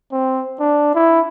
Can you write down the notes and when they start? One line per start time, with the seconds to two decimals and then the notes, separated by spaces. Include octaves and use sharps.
0.12 C4
0.60 D4
0.95 E4